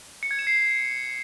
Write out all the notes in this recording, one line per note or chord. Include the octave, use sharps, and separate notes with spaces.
C#7
G#6
E7
C7